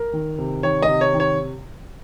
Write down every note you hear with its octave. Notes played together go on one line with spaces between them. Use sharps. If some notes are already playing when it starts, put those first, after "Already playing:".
Already playing: A#4
D#3
C3
D#3 C#5
D#5
C3
C#5
D#3
C#5